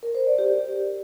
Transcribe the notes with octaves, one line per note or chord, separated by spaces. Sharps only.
A#4
C5
D5
G4